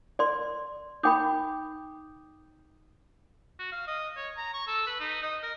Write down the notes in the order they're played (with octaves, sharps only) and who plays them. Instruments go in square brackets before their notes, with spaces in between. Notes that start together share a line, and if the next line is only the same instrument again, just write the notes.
[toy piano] D5 C6
[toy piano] D#4 G5 B5 [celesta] D6 D#6 G6
[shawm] F#4
F5
D#5
C#5
A#5
C#6
A4
B4
D#4
D#5
A#4